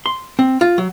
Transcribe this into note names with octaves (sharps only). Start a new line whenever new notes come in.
C6
C4
F4
F#3